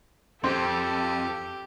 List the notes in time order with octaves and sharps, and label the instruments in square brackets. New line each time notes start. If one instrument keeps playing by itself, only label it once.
[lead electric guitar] F2 [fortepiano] C4 [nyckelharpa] G4 [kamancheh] A4